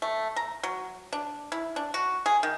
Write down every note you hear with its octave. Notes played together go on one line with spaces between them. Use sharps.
A3
A#5
F#3
D4
E4
D4
F#4
G#4
D#3